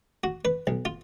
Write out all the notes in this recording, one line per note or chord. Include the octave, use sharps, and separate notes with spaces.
F#4
B4
B1
F4